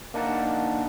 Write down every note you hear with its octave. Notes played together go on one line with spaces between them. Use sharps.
A#3 D4 D#4 D5 F#5 A5